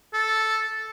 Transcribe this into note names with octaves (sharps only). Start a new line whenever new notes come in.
A4